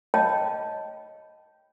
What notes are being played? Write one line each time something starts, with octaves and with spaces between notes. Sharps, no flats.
C#5 D#5 F5 G5 A5